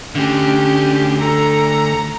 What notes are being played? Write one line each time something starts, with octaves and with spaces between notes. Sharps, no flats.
D2 D3 C#4 G4
A4 A#5